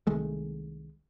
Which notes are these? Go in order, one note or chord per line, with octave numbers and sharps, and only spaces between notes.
C2 D#3 G#3 A3